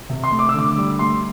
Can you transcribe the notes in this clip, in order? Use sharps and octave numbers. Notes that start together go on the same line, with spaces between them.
C3
C6
A3
D6
E6
D3 D6
G3
A3 C6